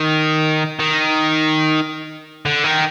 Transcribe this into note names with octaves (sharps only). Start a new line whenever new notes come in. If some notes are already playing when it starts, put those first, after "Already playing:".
Already playing: D#3
D#3
D3
D#3